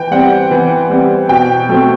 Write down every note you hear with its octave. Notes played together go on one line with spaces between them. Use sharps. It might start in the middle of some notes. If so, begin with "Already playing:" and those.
Already playing: E3 G5
G3 C4 F#5
E3
G3 C4
B2 G5
F#3 A3 C4